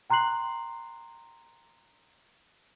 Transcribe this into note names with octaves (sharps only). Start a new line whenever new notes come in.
G5 A#5 C6 F#6 C7 F#7